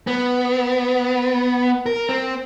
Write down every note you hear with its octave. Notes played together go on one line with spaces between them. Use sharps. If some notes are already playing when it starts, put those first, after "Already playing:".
B3
A#4
C4